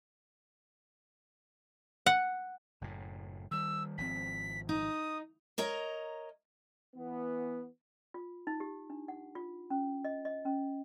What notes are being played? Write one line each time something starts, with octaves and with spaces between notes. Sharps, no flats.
F#5
F#1 F#2 A2
D#3 G3 E6
G#1 F3 C4 B6
D#4 D#6
A#4 C#5 D#5 A#5
E3 B3
F4
D#4
G4
D4
F#5
F4
C#4
D#5
D#5
C#4